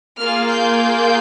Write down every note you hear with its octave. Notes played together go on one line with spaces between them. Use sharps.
A#3 F4 G#4 F6
G6